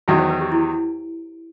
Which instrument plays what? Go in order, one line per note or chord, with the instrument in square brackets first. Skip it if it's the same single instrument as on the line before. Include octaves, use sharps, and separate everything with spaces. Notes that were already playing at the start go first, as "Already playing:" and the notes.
[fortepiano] E2 D#3 F#3 [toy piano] E5
[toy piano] C5
B4
G4
E4